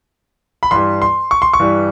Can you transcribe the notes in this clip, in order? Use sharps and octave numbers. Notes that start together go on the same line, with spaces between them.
B5
G2 E3 G3 C6
C6
C#6
C6
C#6
G2 E3 G3